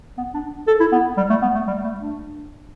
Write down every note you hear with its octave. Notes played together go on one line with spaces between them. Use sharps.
B3
D4
A4
E4
B3
G3
A3
B3
A3
G3
A3
D4